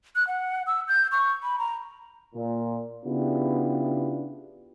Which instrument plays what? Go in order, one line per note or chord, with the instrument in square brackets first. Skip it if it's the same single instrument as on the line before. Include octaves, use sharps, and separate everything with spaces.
[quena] F#6
F#5
E6
G6
C#6
B5
A#5
[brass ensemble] A#2
C#3 B3 D4 E4 F4 G4